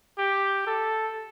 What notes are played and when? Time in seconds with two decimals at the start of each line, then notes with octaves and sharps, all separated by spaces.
0.18 G4
0.67 A4